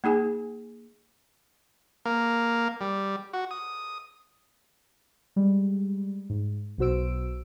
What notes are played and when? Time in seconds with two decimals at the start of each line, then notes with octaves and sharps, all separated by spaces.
0.04 A#3 D#4 G#4 G#5
2.05 A#3
2.81 G3
3.33 F#4
3.51 D#6
5.36 G3 G#3
6.30 G#2
6.78 B1 B2 F#4 C5 E6 D7